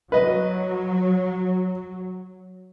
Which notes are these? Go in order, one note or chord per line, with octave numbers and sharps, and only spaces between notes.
F#3 B4 D#5